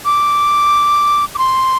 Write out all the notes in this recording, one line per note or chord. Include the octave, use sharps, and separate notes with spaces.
D6
D6
C6